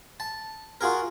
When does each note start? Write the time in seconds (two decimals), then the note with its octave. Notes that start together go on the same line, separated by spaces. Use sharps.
0.20 A5
0.81 F4 F#4 G#4 A#4